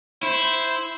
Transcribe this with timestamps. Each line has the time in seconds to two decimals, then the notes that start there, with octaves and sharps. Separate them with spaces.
0.23 E4 C5